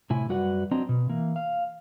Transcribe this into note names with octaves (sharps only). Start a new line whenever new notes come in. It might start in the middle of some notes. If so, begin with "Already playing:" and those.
A2 C3 E4 G#5
F#2 G3 F#4 B4 D5 F#5
F#3 C4 D4 D#5 A#5
B2
E3 A#3
F5